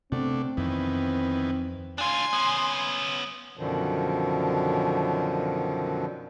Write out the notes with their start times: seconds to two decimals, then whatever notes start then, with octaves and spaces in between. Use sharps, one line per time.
0.12 C3 A3 B3 C4 D4
0.57 F2 D#3 E3 B3
1.98 D4 F4 G#5 C6
2.33 B3 C#4
3.58 F#2 B2 D3 D#3 F3